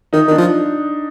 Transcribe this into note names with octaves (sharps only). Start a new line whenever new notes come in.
D#3 D#4
D#3 D4
F3